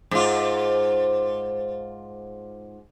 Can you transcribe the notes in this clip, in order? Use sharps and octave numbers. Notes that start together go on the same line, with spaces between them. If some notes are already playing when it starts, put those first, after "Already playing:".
G#2 F4